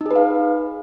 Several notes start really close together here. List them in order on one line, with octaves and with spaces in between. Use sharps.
D#4 G#4 B4 F5